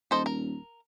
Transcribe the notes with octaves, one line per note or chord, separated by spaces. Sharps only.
D#1 A4 C5 D#5
A#4